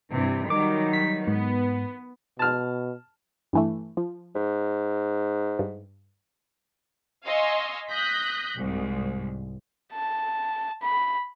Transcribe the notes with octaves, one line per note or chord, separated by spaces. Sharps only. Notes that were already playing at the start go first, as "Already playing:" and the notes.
G2 C3 E3
D#3 F#3 G3 D6
B6
G#2 B3
B2 A5 F6
G2 E3 A3
F3
G#2
G2
D#5 F5 G#5 C6 C#6 E6
D#6 F#6 G6 A#6 B6
C2 G#2
A5
B5